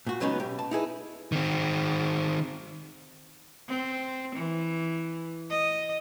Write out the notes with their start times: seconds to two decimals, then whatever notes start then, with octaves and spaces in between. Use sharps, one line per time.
0.07 A#2 F#4
0.20 C#2 F#3 B3 C#4 D#4 B4
0.40 B1 G4
0.59 A5
0.71 D#4 E4 G#4 B4
1.32 D#3 C4
3.68 C4
4.35 E3
5.50 D#5